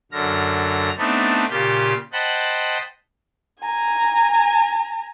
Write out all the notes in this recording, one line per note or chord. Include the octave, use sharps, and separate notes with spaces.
F#2 D3 F6 A#6
A3 B3 C4 D4 D#4
A#2 C#3 F4 G4 G5
C5 D#5 F#5 G5 A5 B5
G#5 A#5